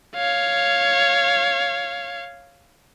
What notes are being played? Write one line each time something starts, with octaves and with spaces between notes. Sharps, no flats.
C#5 F5